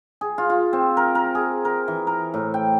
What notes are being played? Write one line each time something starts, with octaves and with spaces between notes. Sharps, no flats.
G#4
F4
F4
C4
A#4
A#4
G#4
A#4
E3
A#4
A2
G5